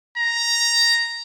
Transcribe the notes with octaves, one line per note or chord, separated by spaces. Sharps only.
A#5